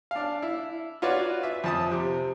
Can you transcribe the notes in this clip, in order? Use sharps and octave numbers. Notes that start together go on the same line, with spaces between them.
D4 F5
E4
F4 F#4 B4 C#5 D5
E5
F2 A5 D#6
C3